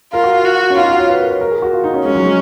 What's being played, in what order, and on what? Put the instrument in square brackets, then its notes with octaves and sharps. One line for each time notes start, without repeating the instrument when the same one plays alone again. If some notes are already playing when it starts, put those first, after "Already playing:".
[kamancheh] F4 [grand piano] A#4
[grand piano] F#4
[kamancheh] F#4
[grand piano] C#4
[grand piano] D#4 [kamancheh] F4
[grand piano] F#4
C#5
B4
A#4
C#5
A#4
G#4
F#4
F4
D#4
C#4
[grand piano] G#3 [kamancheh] C#4
[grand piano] F#3
G#3